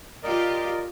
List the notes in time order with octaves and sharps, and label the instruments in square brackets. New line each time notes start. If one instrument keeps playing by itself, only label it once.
[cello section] F4 G4 [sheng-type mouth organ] A#4 D5 D#5